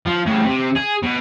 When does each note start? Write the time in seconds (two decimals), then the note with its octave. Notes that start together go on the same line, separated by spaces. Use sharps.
0.06 F3
0.26 A2 C#3
0.45 C3
0.76 G#4
1.03 B2